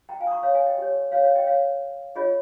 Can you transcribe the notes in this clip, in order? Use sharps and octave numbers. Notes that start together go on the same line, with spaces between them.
G5 A#5
F5 G#5
D#6
A#5 C#6
C#5 F5
F5 G#5
D#5 G5
G4 C#5
C#5 F5
C#5 F5
D#5 G5
C#5 F5
F4 G#4 C#5 D#5